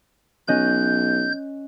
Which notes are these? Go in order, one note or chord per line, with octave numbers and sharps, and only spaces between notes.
B1 C#4 D#5 F#6 G6